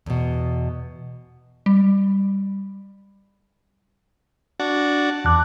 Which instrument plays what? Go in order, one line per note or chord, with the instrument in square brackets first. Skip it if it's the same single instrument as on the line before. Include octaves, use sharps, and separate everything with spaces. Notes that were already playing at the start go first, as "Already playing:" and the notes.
[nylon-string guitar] E2 B2
[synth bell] G3
[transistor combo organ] D4 F#4
[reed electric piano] E2 F#6 [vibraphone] A5 D6